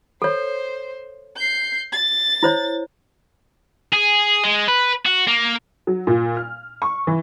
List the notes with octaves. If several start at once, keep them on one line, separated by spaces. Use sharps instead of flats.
A4 C5 C#5
G6 C7
A6
E4 C5 C#5
G#4
G#3
B4
F#4
A#3
F#3
A#2
F6
C#6
E3